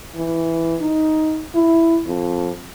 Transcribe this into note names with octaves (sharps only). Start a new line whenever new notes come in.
E3
D#4
E4
F2